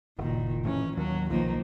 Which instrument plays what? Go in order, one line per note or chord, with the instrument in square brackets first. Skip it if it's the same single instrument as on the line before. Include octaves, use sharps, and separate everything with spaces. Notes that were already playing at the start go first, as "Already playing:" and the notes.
[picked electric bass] F#1 [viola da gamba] A#2 D#3
[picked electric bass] A2 D#3 E3 [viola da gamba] C#4
[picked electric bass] D#2 [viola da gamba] F#3
[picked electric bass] B1 [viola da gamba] D#3 F3 A#3